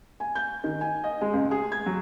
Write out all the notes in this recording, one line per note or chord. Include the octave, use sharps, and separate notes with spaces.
G#5
G6
D#3
G#5
D#5
G#3
C#2
G#4
G#6
F#3